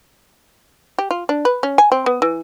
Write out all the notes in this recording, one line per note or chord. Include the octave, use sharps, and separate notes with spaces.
G4
F4
D4
B4
C#4
G#5
C4
B3
E3